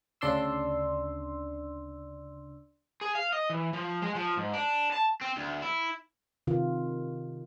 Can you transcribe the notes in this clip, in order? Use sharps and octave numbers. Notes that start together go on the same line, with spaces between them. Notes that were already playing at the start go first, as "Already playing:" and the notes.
D2 C#3 D4 D5 C6 E6
G#4
F5
D#5
E3
F3
G#3
F3
G#2
D4
A5
C4
D2
E4
C3 D#3 F4